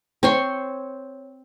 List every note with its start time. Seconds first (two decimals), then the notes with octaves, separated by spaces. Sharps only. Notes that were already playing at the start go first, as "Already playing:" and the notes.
0.23 C4 C#5 C6